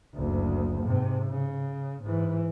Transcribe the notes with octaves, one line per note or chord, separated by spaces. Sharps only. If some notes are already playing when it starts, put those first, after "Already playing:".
F#1 D2
G#2 C3
C#3
G#2 E3